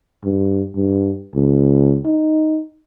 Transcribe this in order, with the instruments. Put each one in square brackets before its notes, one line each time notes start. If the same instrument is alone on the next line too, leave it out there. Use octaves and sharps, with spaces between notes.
[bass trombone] G2
G2
C#2
D#4